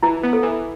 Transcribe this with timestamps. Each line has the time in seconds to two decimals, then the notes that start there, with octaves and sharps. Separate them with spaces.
0.03 E3 E4
0.23 B3
0.33 A4
0.43 E3